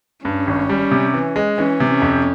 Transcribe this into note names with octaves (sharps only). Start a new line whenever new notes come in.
G2 C#4
G#1
G3
C3
E3
G#3
E3 C#4
C3
C#4
F2